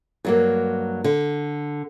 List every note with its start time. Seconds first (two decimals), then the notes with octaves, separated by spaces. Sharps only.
0.25 G2 F#3 A#3
1.04 D3